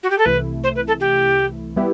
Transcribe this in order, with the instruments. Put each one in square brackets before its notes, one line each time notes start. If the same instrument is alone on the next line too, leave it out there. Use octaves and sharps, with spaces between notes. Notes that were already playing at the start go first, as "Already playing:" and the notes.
[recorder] F#4
G4
A4
[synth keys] C2 C3 E3 A3 E4 [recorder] B4
[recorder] C5
B4
A4
G4
[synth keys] G3 B3 E4 G4